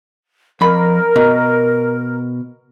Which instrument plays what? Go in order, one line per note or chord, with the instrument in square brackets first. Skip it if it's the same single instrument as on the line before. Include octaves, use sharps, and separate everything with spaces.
[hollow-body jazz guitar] F2 B5 [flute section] A#4
[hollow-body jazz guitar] B2